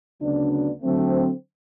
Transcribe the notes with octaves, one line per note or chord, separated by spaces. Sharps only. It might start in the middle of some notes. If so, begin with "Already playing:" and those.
D2 C#3 F#3 B3 D4
D3 F#3 A3 C4